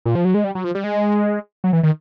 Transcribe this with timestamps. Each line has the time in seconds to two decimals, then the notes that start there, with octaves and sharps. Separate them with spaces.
0.06 A#2
0.15 F3
0.25 F#3
0.34 G#3
0.44 G3
0.55 F#3
0.64 F3
0.75 G3
0.84 G#3
1.64 F#3
1.73 E3
1.83 D#3